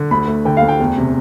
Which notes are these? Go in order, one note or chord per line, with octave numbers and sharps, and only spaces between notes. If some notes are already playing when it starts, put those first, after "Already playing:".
Already playing: D3
D2 B5
A3
D3 G5
F5
D2
G5
E2
C3